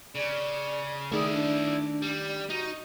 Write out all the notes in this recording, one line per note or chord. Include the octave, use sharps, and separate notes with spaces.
C#3 D5
D#3 A3 E4 G#4 D5
D4
G3
D#4 F#4